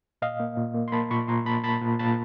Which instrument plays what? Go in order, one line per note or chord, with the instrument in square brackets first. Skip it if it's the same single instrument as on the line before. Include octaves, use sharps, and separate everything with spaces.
[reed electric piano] A#2 D#5 F5
A#3
A#2
A#3
C6
A#3 A5 B5
A#2 B5 C#6
A#2 A#5 C6
A#2 A5 B5
A#2 A5 B5
A#2
A#2 A5 B5